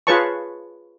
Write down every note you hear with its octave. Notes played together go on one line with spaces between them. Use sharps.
F4 G#4 B4 C#5 A5 C#6